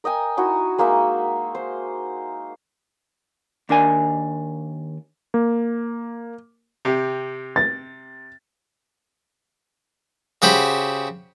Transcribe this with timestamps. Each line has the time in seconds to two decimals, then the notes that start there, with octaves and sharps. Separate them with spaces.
0.04 A#4 D#5 G5 G#5
0.37 D#4 E4 F#4
0.78 G#3 A#3 D#4 E5
1.55 C5
3.69 D#2 D4 A#4 G#5
5.34 A#3
6.85 C3 G4
7.56 A6
10.42 C#3 F#4 G4 C5 B5